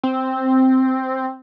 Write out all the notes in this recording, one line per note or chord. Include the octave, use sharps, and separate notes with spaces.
C4